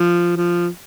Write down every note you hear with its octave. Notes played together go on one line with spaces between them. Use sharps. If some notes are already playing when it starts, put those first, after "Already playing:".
Already playing: F3
F3